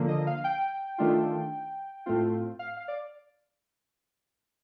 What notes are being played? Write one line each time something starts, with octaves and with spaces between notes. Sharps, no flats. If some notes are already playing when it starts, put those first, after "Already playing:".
Already playing: D3 F3 A#3
D#5
F5
G5
D#3 A3 D4 F4
A2 A3 C4 F4
F5
F5
D5